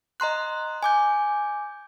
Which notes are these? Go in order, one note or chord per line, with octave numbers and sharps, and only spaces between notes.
D#5 A#5 C6 F#6
G#5 D6 G6